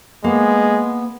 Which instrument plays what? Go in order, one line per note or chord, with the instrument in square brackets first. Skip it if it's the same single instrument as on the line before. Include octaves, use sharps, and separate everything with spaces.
[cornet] G#3 [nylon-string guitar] A#3 [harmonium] B3